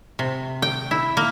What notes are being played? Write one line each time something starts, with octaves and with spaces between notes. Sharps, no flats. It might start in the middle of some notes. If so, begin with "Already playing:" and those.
C3
G5
E4
A#3